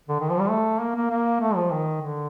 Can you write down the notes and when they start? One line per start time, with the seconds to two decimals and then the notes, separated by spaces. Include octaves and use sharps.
0.08 D3
0.20 D#3
0.30 F3
0.39 G3
0.50 A3
0.81 A#3
0.96 A#3
1.10 A#3
1.41 A3
1.56 F3
1.71 D#3
2.01 D3